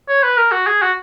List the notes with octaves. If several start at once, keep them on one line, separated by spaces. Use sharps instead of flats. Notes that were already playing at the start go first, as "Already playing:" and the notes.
C#5
B4
A#4
F#4
G#4
F#4